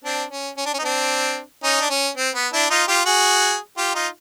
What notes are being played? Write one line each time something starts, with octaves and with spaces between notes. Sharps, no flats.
C4 D4
C#4
C#4
D4
C#4
D#4
C4 D4
C#4 D#4
D4
C#4
C4
B3
D4 E4
D#4 F4
F4 G4
F#4 G#4
F4 G4
D#4 F4